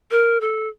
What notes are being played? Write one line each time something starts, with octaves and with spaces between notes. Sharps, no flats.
A#4
A4